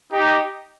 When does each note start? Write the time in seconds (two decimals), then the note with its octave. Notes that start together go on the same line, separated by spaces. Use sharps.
0.12 D#4 G4